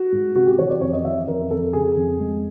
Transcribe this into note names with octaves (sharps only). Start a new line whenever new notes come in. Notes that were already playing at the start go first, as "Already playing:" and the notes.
Already playing: F#4
G#2
C3 F#4
G4
E3 C#5
D5
F2 C#5
D#5
E3 E5
F2 A#4
F2 A4
C#3 G#4
F2
G#3